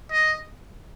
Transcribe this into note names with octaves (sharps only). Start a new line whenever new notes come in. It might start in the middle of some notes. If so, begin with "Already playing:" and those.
D#5